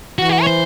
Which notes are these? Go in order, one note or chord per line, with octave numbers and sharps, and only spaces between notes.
E3 F#4
G4
F#4
C#5
C5